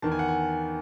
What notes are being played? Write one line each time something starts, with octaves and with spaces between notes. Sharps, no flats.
E2 D#3 A5
G#5
F#5
G#5